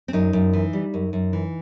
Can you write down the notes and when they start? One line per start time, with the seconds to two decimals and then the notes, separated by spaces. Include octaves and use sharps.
0.08 C4
0.13 F#2 D#4
0.33 F#2
0.53 E3
0.73 G3
0.94 F#2
1.13 F#2
1.33 E3